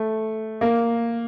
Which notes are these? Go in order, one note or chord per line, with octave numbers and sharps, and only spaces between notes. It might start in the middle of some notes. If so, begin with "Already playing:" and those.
Already playing: A3
A#3